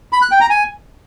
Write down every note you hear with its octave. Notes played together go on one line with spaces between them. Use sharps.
B5
F#6
G5
A#5
G#5